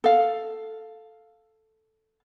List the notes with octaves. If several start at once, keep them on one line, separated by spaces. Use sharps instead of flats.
A4 F5